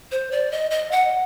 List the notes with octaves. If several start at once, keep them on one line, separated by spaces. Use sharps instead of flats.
C5
D5
D#5
D#5
F#5